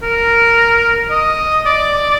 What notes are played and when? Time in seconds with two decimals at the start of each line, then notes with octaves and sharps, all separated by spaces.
0.02 A#4
1.11 D#5
1.66 D5